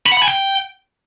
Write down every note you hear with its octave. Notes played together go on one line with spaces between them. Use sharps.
B5
F#5
B5
G#5
G5